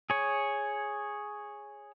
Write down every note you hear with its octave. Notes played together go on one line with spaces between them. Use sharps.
G#4 C#5